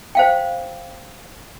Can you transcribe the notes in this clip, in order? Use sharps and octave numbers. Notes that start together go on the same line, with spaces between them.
C5 F5 G5